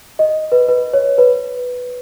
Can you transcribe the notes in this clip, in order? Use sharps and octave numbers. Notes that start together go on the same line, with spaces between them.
D#5
B4
B4
C#5
B4